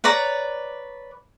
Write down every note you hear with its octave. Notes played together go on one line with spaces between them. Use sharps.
B4 C#5 D5 A#5